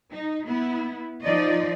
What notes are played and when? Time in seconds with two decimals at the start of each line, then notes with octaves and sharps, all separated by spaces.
0.12 D#4
0.46 B3 E4
1.23 F3 D#4 D5 D#5